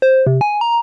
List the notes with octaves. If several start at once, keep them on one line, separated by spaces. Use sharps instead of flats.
C5
C3
G#5
A#5